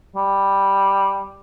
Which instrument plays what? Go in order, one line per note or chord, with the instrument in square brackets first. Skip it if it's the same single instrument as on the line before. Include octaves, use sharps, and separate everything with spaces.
[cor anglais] G3